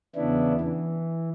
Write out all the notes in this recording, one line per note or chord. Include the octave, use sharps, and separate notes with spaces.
E2 C#3 B3 D4 E4
E3